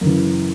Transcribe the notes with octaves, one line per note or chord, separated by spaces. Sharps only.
F#2 C#3 E3